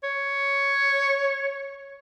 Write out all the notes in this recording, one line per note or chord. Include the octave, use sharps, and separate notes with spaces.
C#5